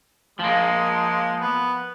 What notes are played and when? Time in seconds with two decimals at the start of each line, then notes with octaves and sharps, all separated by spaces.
0.39 F3 G#3 A#3
1.41 B3